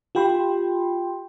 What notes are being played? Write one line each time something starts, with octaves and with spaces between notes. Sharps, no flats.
F4 G4 G5 B5 C6